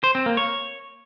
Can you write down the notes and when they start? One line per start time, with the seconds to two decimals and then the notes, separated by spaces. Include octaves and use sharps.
0.04 C5
0.15 C4
0.26 A#3
0.37 C#5